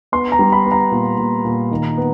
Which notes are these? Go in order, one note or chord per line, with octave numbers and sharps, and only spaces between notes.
B3 C6
A#5
G3
B5
B3
A#5
A#2
A#2
A#2
D#3
B3